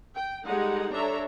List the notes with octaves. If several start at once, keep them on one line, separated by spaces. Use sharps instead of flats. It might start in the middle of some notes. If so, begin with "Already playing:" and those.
G5
G3 G#3 D#4 G4 A4 F#5
D4 A4 C#5 E5 A#5